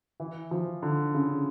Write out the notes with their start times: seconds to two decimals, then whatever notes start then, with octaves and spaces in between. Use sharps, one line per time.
0.20 E3
0.51 F3
0.83 D3
1.14 C#3